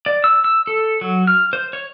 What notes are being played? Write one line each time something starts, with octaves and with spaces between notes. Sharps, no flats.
D5
E6
E6
A4
F#3
F6
C5
C#5